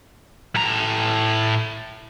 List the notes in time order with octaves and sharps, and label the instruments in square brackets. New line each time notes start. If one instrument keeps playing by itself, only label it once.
[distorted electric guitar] A2 A#5